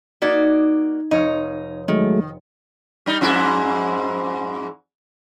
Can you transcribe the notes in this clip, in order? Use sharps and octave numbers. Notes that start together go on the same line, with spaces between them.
A#3 D#4 F#4 D5 G#6 B6
F1 D#4 C#5 F5
D#3 F#3 G#3 A3
G3 D#4
F2 G#2 E4